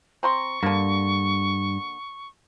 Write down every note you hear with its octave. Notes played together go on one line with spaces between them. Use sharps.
C4 A#5 C6 C#6
G2 D3 A#3